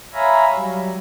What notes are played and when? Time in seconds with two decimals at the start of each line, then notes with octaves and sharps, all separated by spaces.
0.14 C#5 E5 F5 G#5 A#5 B5
0.53 F#3 G3